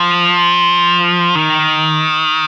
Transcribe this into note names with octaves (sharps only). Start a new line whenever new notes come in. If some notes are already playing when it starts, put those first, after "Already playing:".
Already playing: F3
D#3